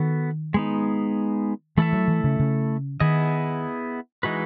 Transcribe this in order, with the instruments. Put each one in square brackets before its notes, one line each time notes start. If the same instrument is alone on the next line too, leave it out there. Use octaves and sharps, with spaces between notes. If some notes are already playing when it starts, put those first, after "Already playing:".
Already playing: [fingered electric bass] D#3 [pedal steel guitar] B3 F#4 A4
[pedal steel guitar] G#3 B3 D#4
[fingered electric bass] E3 [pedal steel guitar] A3 E4 A4 E5
[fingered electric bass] F#3
E3
C#3
C#3
[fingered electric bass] D#3 [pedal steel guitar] B3 E4 G#4 D#5
[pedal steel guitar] E3 G#3 D#4 F#4 B4